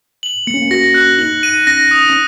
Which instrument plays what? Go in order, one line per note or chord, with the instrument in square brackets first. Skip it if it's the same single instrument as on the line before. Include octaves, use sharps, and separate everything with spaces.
[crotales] F#7
[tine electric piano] A#3 [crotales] C#7
[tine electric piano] C#4
A#3
[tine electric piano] F#4 [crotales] A#6
[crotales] F#6
[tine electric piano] D#4 [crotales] F#7
[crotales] D#7
[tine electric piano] C#4 [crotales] A#6
[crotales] D#6
[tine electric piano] C#4